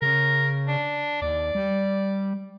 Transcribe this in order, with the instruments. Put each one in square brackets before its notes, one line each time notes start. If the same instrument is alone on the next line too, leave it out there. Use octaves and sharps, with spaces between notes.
[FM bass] C#3 [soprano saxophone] A#4
[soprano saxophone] D4
[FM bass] D#2 [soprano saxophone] D5
[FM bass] G3